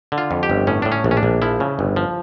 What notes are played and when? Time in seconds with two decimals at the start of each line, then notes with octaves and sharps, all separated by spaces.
0.12 D3
0.18 F4
0.31 F2
0.43 G4
0.50 G1
0.67 A2 C#4
0.82 A2 D4
0.92 C#4
1.04 A#1
1.11 C#4
1.17 D4
1.23 A#1
1.42 F3 E4
1.60 C#3
1.79 G1
1.96 F3